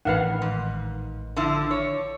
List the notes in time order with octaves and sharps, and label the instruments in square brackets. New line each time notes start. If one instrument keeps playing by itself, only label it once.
[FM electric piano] A1 D#3 [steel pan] B4 F5 F#5
[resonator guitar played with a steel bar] G#2
D3 F3 E4
C#5